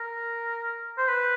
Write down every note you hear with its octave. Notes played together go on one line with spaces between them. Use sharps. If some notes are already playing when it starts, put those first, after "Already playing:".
Already playing: A#4
C5
B4